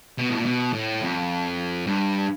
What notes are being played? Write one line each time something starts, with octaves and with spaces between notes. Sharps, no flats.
B2
A2
A#2
B2
A2
F2
G2